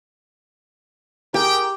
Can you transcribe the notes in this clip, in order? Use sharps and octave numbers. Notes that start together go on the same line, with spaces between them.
G4 G#4 A#4 G5